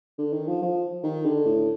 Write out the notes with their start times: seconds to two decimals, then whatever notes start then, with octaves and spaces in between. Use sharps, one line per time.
0.19 D3
0.33 D#3
0.48 F3
0.62 F3
1.04 D#3
1.26 D3
1.46 A2